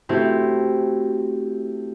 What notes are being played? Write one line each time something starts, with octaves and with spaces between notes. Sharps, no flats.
A3 C4 E4 F#4 G4